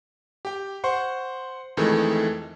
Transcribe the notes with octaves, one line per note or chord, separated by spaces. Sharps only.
G4 G5
C5 F#5 C6 C#6
F2 D#3 E3 G#3 A3